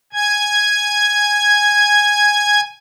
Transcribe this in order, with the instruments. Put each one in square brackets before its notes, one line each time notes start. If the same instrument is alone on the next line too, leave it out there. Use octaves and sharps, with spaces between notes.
[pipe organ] G#5 G#6